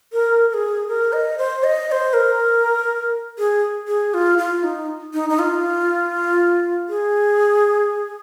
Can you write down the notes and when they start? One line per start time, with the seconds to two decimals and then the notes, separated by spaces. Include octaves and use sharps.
0.13 A#4
0.50 A#4
0.54 G#4
0.89 A#4
1.13 D#5
1.38 C5
1.64 D#5
1.88 D#5
1.92 C5
2.13 A#4
3.39 G#4
3.88 G#4
4.14 F4
4.38 F4
4.63 D#4
5.14 D#4
5.29 D#4
5.39 F4
6.89 G#4